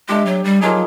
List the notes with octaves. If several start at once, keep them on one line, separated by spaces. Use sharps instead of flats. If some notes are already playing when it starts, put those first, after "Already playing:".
G#3 A3 D4 G4
F#3
G3
F3 F#3 A#3 D#4 G#4